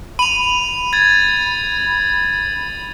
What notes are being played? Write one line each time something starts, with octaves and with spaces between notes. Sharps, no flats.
B5 D#7 F7
G#6 A6